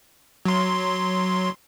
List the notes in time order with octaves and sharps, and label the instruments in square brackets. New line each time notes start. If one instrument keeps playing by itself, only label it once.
[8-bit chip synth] F#3 C6